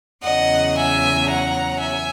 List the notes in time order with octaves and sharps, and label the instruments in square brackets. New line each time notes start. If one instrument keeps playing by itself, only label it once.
[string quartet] E2 C#3 F#3 D#5 F#5
E5 G#5
F#5 A#5
E5 G#5